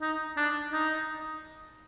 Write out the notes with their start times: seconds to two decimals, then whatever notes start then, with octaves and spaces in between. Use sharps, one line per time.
0.01 D#4
0.37 D4
0.72 D#4